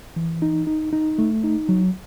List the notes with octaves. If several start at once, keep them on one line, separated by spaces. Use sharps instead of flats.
E3
D#4
D#4
D#4
A3
D#4
F#3